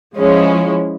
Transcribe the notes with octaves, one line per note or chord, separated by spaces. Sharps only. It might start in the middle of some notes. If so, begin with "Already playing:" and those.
F3 G#3 C#4 E4